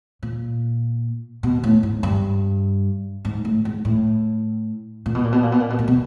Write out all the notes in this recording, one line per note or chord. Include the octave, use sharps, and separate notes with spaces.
A#2
B2
A2
G#2
G2
G#2
A2
G#2
A2
A#2
B2
A#2
B2
A#2
B2
A#2
B2
A#2
B2